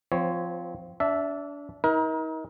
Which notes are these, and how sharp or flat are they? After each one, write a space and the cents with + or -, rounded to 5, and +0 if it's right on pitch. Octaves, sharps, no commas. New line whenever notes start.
F3 +0 C4 -20 C#5 +0
D4 -30 E5 +0 A5 +0
D#4 +40 A#4 +30